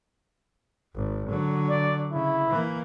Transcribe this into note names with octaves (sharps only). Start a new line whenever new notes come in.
G#1
D3 F#3
D5
C#3 E4
E3 A#3